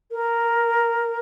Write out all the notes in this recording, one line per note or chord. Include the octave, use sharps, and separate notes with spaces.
A#4